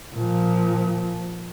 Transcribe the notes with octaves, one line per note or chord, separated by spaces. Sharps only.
A#2 F3